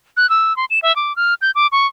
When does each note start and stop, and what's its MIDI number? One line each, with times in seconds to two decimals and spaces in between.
0.17 0.29 90
0.29 0.55 88
0.57 0.65 84
0.70 0.79 100
0.82 0.95 76
0.96 1.15 86
1.16 1.34 89
1.42 1.51 91
1.55 1.67 86
1.72 1.87 85